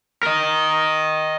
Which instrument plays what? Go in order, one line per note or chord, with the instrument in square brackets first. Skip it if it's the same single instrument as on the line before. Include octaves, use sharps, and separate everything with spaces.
[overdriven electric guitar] A#4 D#5